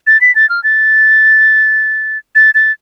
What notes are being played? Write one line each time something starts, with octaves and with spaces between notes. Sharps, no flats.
A6
B6
A6
F6
A6
A6
A6